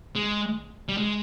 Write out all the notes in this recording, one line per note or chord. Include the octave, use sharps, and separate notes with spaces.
G#3
G3
G#3